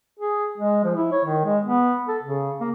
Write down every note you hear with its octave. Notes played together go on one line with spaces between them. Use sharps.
G#4
G#3
F3
E4
C#5
D#3
G#3
B3
A4
C#3
A#3